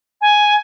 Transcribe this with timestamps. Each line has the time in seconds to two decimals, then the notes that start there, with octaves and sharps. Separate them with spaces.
0.21 G#5